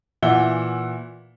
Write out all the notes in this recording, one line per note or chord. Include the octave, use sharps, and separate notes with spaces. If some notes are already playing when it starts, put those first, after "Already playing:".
A#2 E3 E5 F#5 G7